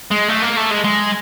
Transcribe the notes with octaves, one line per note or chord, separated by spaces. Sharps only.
G#3
A3
A#3
A3
G#3
G#3